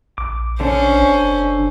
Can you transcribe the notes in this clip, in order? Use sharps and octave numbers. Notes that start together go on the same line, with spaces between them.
A#1 D6
D3 C#4 D4 C5
F#1